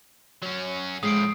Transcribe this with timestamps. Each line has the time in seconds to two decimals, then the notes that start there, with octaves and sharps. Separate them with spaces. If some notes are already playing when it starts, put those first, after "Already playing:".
0.42 F#3 C#4
1.03 A2 F3 G#3 D#6 C7 D7